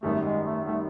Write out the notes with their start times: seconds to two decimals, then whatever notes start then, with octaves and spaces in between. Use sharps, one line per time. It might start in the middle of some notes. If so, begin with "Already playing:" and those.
0.03 G#1 F#2 D#3 G3 A3
0.25 G#3
0.45 A3
0.67 D#3 G3 A3